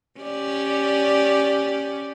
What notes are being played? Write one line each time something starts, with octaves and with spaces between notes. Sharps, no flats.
C#4 G4 D5